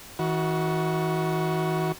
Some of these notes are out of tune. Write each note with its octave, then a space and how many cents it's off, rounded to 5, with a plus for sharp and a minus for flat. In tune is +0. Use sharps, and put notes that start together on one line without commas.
E3 -45 F#4 +0